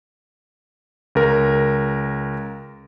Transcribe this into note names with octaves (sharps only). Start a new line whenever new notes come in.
C#2 A#4